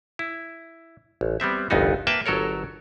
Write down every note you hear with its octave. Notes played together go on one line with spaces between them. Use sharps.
E4
A1
G3 B3 C4 E5
G1 C2 F2 B3 D#4 F#4
A#3 B4 E5 G5 A5
G1 F#3 A4 A#4 C#5